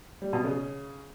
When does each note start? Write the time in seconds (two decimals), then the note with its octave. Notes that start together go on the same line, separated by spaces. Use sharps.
0.22 G3
0.33 B2
0.44 C#3